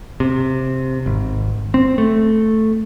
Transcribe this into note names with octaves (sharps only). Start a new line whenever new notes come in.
C3
G#1
C4
A3